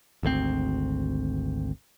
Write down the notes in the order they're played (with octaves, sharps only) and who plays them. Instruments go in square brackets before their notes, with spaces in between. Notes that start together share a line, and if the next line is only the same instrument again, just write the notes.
[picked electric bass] G#1 D2 C#3 C4